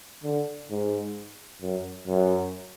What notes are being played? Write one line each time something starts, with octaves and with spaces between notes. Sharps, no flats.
D3
G#2
F#2
F#2